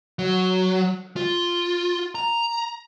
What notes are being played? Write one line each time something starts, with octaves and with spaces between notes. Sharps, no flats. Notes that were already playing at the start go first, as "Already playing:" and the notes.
F#3
F4
A#5